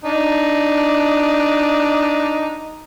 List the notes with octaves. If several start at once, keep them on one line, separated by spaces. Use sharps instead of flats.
D4 D#4